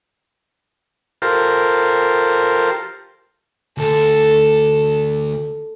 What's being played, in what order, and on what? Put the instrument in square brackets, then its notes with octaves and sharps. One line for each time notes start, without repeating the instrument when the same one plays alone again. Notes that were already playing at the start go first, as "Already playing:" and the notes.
[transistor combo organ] F4 G4 A4 A#4 C5
[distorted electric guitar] D2 [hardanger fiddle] A4